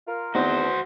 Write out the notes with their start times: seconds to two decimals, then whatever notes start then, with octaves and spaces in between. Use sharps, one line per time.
0.07 F4 A#4
0.35 E2 B3 C4 D#4 F#4 C5